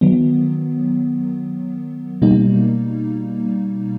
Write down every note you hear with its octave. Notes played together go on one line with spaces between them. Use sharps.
D#3 F#3 B3
B2 G3 A#3 D#4